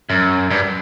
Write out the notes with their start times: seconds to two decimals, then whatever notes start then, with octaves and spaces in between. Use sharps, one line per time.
0.10 F#2
0.51 G2